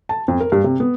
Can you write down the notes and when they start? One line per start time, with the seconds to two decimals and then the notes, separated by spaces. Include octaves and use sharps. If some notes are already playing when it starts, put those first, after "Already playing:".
0.09 A5
0.28 F2
0.40 A#4
0.52 G2
0.64 C3
0.80 B3